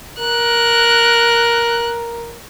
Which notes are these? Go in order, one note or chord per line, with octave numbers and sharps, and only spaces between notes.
A#4 F#6